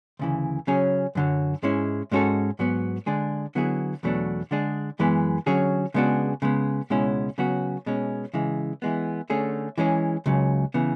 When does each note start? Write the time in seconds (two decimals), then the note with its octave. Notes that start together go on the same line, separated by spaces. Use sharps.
0.19 D2 C#3 E3
0.67 C#3 F#3 C#4 G#4
1.15 F#2 D3 F#3
1.63 G#2 G#3 C#4 E4
2.11 G#2 G#3 C#4 F#4 A4
2.59 G#2 F#3 B3
3.06 D3 G#3 D4 G#4
3.55 D3 F#3 B3 E4 G#4
4.03 E2 B2 F#3 A3 D4
4.51 D3 G#3 D4 G#4
4.99 F#2 E3 G#3 B3
5.46 D3 F#3 C#4 G#4
5.94 C#3 G#3 B3 D4 F#4
6.42 C#3 G#3 B3
6.90 C#2 B2 G#3 C#4 E4
7.38 C#3 F#3 B3 F#4
7.86 B2 G#3 C#4
8.34 C#3 E3 G#3
8.82 E3 G#3 B3
9.30 D3 A3 C#4 G#4
9.78 E3 G#3 C#4 G#4
10.26 C#2 C#3 F#3
10.74 C#3 E3 B3